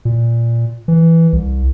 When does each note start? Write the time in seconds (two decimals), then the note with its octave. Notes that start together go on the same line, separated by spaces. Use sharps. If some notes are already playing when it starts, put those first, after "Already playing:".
0.05 A#2
0.88 E3
1.33 C2